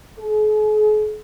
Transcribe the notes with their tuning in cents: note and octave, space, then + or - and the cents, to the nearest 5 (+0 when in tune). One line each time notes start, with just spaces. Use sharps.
G#4 +45